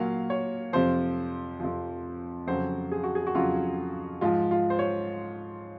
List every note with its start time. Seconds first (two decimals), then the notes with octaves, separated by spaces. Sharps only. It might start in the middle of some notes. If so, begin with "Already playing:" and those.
Already playing: A#2 F#3 F5
0.30 C#5
0.73 F2 C3 F3 C5
1.60 F2 C3 F3
2.47 F2 C#3 F#3 C5
2.92 G#4
3.03 F#4
3.15 G#4
3.27 F#4
3.35 F2 C#3 F#3 F4
4.21 G#2 F3 F4
4.51 F4
4.70 C5
4.79 C#5